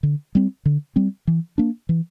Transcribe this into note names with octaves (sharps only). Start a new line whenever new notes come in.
D3
G3 C4
D3
G3 C4
E3
A#3 D4
E3